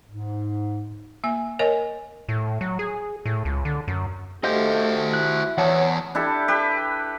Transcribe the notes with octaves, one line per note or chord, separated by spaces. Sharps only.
G#2
A#3 G#5
A#4 C#5 D#5 G#5
A2
F#3
G#4
A2
C#2
D3
F#2
A3 F#4 G4 C5 D#5 F5 G6
E4 F#6
E2 C#5 F#5 A5
D4 E4 G4 A4
G4 B4